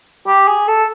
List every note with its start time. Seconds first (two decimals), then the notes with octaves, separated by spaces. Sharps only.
0.27 G4
0.48 G#4
0.68 A4